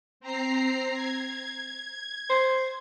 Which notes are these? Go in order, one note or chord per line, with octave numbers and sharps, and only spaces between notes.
C4 A#5 C7
G#6
C5